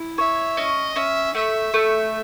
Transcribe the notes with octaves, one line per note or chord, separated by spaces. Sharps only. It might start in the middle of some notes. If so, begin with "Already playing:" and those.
Already playing: E4
C#5 E5
C#4 D#5
C#4 E5
A3 E5
A3